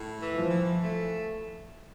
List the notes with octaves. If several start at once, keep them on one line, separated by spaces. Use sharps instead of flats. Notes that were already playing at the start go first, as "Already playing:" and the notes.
Already playing: A2
E3
F3
E3
A3